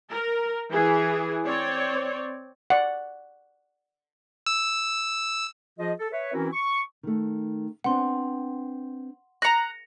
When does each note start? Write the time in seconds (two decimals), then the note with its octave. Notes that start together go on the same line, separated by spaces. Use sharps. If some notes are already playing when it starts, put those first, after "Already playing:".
0.11 A#4
0.72 E3 G#4
1.46 C4 C#5 D5
2.70 D5 F#5
4.47 E6
5.78 F3 F4 G#4 D#5
5.99 A4
6.12 B4 C#5 E5
6.33 E3 C4 C#4 E4 F#4 A#4
6.53 C#6
7.03 D#3 A3
7.84 B3 C4 D4 F#5 C6
9.42 A#5 F#6 A#6 C#7 F7